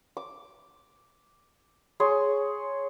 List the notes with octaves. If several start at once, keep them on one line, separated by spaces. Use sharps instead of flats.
D6
G#4 C#5 C6